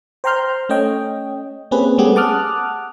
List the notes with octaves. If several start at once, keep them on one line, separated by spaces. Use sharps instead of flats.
C5 G5 A#5 C6 F6 G6
A3 C#4 C#5 D#5 G5
A#3 C4 C#4 G4 G#4 B4
G3 A3 B3 C#4 G4 G#4
F#5 A5 D6 D#6 F6 F#6